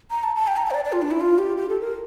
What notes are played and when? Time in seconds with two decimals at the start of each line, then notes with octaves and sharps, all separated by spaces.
0.11 A#5
0.23 A5
0.36 A5
0.47 G5
0.57 A#5
0.65 A5
0.71 C5
0.74 D5
0.85 D5
0.92 F4
1.02 D4
1.11 E4
1.21 F4
1.38 G4
1.57 G4
1.69 A4
1.81 A#4